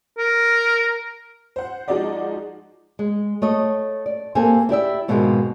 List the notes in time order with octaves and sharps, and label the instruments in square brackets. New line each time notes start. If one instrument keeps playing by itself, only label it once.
[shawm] A#4
[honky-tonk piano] C5 F#5
F3 G#3 D#4 F#4 D5 D#5
[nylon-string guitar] G#3
A3 C#5 D#5
D5
A#3 C4 G4 A4 G#5
E4 G4 D5 E5
G#2 B2 D#3 F3 G#3 C4